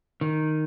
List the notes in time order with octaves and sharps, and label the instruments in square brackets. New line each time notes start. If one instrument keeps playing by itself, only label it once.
[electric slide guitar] D#3